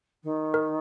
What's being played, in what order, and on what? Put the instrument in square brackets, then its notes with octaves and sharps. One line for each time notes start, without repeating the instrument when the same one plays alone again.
[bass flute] D#3
[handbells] A#4